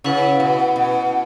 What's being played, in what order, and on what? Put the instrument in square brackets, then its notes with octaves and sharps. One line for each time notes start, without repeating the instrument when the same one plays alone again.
[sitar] C#3 [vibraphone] C#4 E4 B4 F#5
[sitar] B2
B2